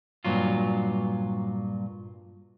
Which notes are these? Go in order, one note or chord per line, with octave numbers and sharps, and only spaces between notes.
G2 A#2 F#3 F4